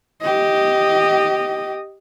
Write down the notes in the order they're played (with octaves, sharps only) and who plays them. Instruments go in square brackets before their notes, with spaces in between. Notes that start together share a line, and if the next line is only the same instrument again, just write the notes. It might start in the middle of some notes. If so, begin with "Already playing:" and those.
[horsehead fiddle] G4 D#5